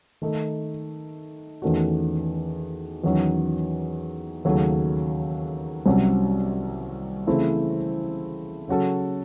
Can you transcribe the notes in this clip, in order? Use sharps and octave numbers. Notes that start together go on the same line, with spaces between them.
D#3 A3 D#4
E2 D#3 A3 C#4 F#4
E2 D#3 F#3 C#4
D#2 C#3 F#3 A3
C2 C3 F#3 C#4
C#3 E3 A3 C4 E4
C#3 F#3 C#4 F#4 A4